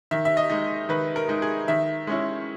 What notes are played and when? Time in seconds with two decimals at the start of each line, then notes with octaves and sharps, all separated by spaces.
0.11 D#3 E5
0.25 E5
0.37 D#5
0.50 G#3 D#4
0.89 D#3 B4
1.16 A#4
1.28 G#3 D#4
1.42 G#4
1.68 D#3 E5
2.07 G#3 C#4 E4